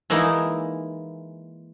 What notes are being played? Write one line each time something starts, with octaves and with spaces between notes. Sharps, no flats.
E3 G#3 A#3 D#4 E4